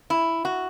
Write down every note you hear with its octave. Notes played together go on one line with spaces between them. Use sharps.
E4
F#4